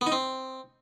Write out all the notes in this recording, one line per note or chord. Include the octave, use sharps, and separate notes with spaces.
B3
D#4
C4